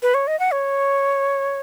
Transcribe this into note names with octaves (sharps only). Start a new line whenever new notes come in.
B4
C#5
D#5
F#5
C#5